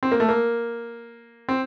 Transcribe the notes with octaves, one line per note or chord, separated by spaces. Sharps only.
C4
A#3
A3
A#3
C4